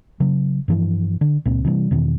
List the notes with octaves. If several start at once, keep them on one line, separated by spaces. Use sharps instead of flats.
C#3 F#3
G2 E3 F3
D3
C#2 A#2 C4
C3 E3 G3
E2 B2 D#3